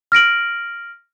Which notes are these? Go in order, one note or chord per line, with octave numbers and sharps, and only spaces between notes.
F6 A#6 D7 F#7